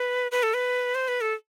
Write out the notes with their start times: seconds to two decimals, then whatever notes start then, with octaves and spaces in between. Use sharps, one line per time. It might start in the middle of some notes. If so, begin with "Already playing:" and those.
Already playing: B4
0.32 B4
0.43 A4
0.54 B4
0.95 C5
1.08 B4
1.21 A4